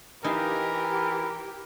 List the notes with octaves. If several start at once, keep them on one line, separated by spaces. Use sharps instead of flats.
E3 D#4 G4 A#4 E5 F5